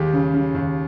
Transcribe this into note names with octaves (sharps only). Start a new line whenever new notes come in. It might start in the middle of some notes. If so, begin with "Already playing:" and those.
Already playing: D#2 G#3 G4
C#3
C#3
D#2